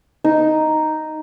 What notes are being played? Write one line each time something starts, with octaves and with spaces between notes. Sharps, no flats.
D#4